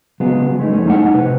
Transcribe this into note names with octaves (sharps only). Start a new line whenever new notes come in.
C#3 F#3 G#3 B3
G#3 A3 D4 D#4
F2 A3 C#4
A3 D#4 E4 E5 F#5
C3 B4